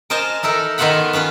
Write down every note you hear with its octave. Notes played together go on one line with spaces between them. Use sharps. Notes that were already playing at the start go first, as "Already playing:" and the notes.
A#4 C5 D#5 G#5 A5
D#4 E4 A4 A#4
D#3 B3 F4 E5 F#5 B5
B3 C#4 F4 B4